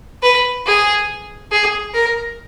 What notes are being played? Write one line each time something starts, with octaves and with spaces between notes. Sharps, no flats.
B4
G#4
G#4
A#4